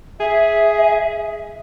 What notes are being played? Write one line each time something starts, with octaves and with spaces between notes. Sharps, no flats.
G#4 E5